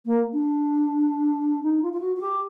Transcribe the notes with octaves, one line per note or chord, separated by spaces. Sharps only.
A#3
D4
D#4
F4
F4
F#4
F#4
G4